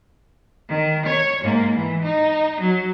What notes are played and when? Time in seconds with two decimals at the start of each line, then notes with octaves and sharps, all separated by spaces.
0.69 D#3
1.06 C#5
1.43 G#2 A#3
1.76 E3
2.04 D#4
2.61 F#3